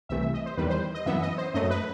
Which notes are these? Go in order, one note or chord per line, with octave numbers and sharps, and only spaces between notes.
C2 C3 E3 A3 E5
E5
D#5
C5
E2 D#3 G3 B4
C5
D#5
F#2 E3 B3 E5
D#5
C5
F#2 F#3 A3 D#5
B4